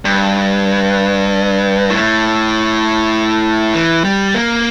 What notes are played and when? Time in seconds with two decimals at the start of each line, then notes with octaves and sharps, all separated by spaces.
0.05 G2
1.90 A2
3.74 E3
4.04 G3
4.34 A#3